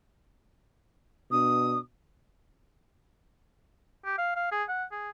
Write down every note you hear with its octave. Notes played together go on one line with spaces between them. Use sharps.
B2 D4 D#6
G4
F5
F5
G#4
F#5
G#4